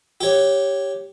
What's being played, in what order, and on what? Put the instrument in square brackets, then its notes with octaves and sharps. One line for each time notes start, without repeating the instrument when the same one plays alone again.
[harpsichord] G4 C#5